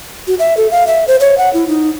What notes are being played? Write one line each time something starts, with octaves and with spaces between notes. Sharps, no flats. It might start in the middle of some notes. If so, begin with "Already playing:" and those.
F#4
E5
A4
F5
E5
C5
C#5
F#5
E4
D#4